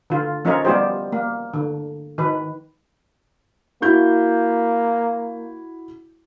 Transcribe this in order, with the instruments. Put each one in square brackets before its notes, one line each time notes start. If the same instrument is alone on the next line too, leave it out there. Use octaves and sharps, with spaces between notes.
[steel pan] D3 F4
F3 C#4 D#4 F4 A#4 C#5
G3 B3 F4 G4 C5
A#3
D3
D#3 B4
[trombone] A#3 [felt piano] E4 F#4 G6